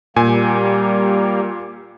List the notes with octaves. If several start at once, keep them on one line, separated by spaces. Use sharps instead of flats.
A#2 G3 A#3 G#5